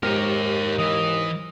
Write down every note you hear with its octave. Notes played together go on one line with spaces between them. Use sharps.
D#2 G#2 G4 A#4 C#5 F6
E3 D#5